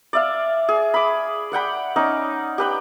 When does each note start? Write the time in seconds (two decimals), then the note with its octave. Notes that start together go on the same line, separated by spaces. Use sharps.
0.13 D5 E5 F5
0.69 G#4
0.94 B5 D6
1.52 D5 F#5 G5 B5
1.96 C#4 D#4 D5
2.58 G4 B4 G5